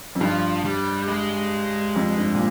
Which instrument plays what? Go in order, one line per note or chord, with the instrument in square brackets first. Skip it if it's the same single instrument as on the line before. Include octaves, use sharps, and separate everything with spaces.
[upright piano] F2
[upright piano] G2 [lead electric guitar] F3
[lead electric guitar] G3
G#3
[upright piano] F2
G2
A#2